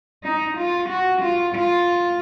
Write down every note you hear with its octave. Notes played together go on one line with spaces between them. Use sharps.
D#4
F4
F#4
F4
F4